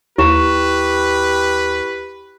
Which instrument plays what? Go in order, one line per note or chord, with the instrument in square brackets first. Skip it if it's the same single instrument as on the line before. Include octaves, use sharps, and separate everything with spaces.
[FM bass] D#2 [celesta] E4 C#6 E7 [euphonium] G4 [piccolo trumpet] B4